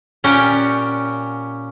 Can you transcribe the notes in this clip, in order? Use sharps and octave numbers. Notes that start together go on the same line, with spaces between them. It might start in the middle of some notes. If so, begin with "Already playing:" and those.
A#2 C#4 G4 A#4 F#5 G5